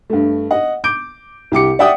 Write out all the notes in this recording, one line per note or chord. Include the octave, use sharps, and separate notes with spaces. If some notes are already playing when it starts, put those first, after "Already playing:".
G2 A3
D#5 F#5
D6 G6 D7
C2 G4 D6 C#7
D5 E5 F#5 G5 D#6